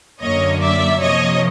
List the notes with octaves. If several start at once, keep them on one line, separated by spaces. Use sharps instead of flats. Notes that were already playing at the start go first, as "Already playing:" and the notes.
F#2 D3 F#3 A#3 C#5 D#5
D5 E5
C3 F3 A#3 C#5 D#5